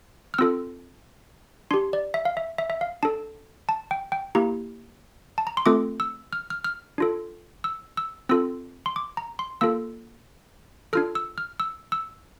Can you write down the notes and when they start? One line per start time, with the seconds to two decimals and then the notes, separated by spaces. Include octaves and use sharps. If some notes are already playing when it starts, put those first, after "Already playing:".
0.34 F6
0.38 C4 F4 A4 E6
1.71 D4 G4 C6
1.93 D5
2.14 E5
2.25 F5
2.37 E5
2.58 E5
2.70 E5
2.81 F5
3.03 D4 A4 A5
3.69 A5
3.91 G5
4.12 G5
4.35 A#3 E4 G4 A#5
5.38 A5
5.47 A#5
5.57 C6
5.66 A3 C4 F4 A4 D6
6.00 E6
6.33 F6
6.50 F6
6.64 F6
6.98 D4 F4 A4
7.64 E6
7.97 E6
8.29 C4 F4 A4 E6
8.86 C6
8.96 D6
9.17 A#5
9.39 C6
9.61 A#3 F4 A4 E6
10.93 D4 F4 A4 F6
11.15 E6
11.38 F6
11.60 E6
11.92 E6